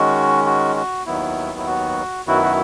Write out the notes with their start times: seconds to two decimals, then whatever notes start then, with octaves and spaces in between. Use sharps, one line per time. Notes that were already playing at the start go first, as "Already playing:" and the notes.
Already playing: D#3 G#3 C#4 F#4
0.46 F#4
0.76 F#4
1.06 D#2 D#3 F#3 B3 E4
1.58 E4
1.67 F#4
2.27 F#2 D#3 F#3 B3 E4 F#4
2.42 F#4